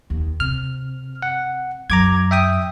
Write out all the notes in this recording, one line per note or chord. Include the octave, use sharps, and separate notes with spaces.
D#2
C3 F6
F#5
F#2 A#5 D6 G#6
E5 G5 D#6